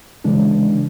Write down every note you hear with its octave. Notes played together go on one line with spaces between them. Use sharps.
C#3 E3 G#3 D4